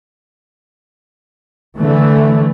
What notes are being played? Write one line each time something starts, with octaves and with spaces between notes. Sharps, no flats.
D3 E3 A3